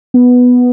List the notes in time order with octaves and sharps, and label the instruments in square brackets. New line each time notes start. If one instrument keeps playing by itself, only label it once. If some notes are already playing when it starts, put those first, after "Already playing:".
[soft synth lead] B3